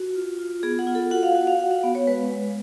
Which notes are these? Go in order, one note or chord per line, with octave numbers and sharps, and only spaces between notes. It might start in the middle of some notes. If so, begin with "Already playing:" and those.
Already playing: F#4
F4
F4
B3 G#4
F#5
F4
A4
F#4 F#5
F5
F#4 F#5
F5
F#4 F#5
F5
B3
C#5
G#3 B4
G#3